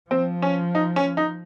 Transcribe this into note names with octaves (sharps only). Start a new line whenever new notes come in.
F3 C4
C#4
D#4
C#4
D#4